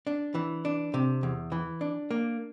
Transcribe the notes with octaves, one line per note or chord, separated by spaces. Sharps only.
D4
E3
D4
C3
E2
E3
D4
A#3